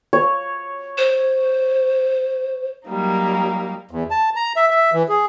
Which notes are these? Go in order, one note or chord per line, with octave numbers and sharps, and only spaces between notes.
C#5
C5
F#3 G3 A#3 D#4
E2
A5
A#5
E5
E5
E3
G#4